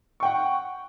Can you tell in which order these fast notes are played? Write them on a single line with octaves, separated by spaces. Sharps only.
C#6 G5 F#5